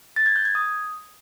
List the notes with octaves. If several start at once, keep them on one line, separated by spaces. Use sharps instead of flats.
A6
G#6
G6
G#6
D#6